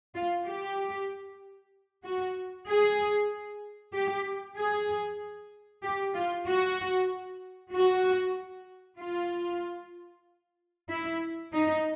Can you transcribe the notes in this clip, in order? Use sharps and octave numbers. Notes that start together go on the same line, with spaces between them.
F4
G4
F#4
G#4
G4
G#4
G4
F4
F#4
F#4
F4
E4
D#4